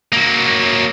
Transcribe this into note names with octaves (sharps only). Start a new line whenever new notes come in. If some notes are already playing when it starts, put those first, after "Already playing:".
F#3 A#3